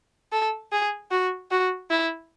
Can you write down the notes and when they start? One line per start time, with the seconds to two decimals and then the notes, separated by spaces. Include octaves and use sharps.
0.32 A4
0.72 G#4
1.11 F#4
1.51 F#4
1.90 E4